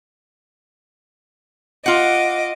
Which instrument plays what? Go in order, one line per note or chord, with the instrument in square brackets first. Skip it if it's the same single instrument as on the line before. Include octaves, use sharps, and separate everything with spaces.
[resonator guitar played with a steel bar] F4 F#5 [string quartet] D#5 D6